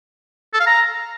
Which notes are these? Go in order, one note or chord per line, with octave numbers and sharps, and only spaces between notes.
A4
F5
A#5